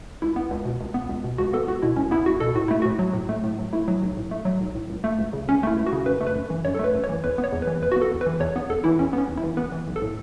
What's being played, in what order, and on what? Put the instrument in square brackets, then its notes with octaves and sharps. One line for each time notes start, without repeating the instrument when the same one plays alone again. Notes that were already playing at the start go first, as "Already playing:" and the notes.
[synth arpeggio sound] C#2 E4
B3
C#2
B2
C#2
B3
C#2
B2
C#2 F#4
B3 A4
C#2 F#4
B2 E4
C#2 C#4
B3 E4
C#2 F#4
B2 A4
A2 F#4
A3 E4
A2 F#4
F#3
A2
A3
A2
F#3
A3 E4
F#3
B1
A2
A3
F#3
B1
A2
C#2
A3
C#2
C#3
C#2 C#4
A3 E4
C#2
F#4
C#3
F#2 B4
A3
B4
F#2
E3
F#2 C#5
A4
A3 B4
F#2
C#5
E3
E2 B4
B3
C#5
E2
B4
E3
E2 B4
F#4
B3
A4
E2
B4
E3
E2 C#5
B3
E2 A4
E3 E4
E2 C#4
B3
C#4
E2
E4
E3
B3 B4
E3
B1
A4
A2